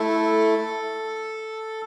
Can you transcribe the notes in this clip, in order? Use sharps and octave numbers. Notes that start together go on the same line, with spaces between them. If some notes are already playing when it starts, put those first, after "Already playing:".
Already playing: A3 E4 A4